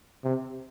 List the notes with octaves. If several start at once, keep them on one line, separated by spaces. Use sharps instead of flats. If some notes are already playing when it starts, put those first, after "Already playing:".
C3